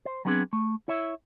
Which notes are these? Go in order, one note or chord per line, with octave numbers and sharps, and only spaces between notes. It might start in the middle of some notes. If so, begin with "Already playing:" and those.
C5
F#3 G3 B3 C4 D4 G#4
A3
E4 C#5 E5